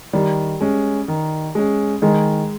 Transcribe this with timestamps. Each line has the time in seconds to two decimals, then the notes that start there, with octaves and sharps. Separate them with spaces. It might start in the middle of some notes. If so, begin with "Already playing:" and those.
0.13 D#3 G3
0.61 G#3 C#4
1.08 D#3
1.55 G#3 C#4
2.02 D#3 G#3